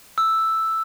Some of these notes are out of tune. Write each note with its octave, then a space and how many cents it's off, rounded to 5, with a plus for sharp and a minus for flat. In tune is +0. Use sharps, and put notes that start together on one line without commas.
E6 +0